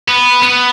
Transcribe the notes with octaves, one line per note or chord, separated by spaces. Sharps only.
B3
B3